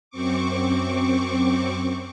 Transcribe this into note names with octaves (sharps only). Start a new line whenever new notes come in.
F#2 C4 C#6 D6